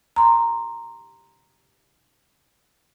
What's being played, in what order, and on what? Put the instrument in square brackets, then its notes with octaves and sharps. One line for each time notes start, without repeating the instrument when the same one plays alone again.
[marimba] A#5 C6